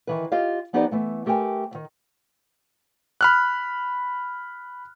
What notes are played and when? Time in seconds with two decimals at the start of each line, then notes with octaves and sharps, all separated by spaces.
0.07 D#3 E3 B4
0.32 F4 G4 D#5 F5
0.73 F3 B3 D#4 G4 B4 D5
0.91 E3 A3 B3
1.26 A3 G4 A#4 B4 G5 G#5
1.71 D2 D#3
3.21 B5 F6 F#6